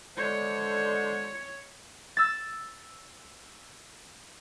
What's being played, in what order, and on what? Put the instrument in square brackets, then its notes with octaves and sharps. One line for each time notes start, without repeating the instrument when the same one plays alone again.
[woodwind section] D3 G#3 C5 [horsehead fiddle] C#5
[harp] E6 A6